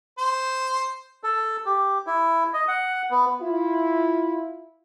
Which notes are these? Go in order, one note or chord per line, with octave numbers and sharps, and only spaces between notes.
C5
A4
G4
E4
D#5
F#5
B3
E4 F4